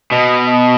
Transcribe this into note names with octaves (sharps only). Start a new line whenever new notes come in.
B2 D#5
D#5